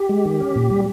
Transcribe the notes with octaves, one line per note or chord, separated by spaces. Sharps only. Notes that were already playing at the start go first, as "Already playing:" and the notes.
Already playing: G4
G#3
D#3
C#4
A#2
G3